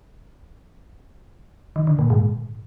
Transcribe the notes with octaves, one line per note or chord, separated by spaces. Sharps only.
D#3
D3
A#2
G#2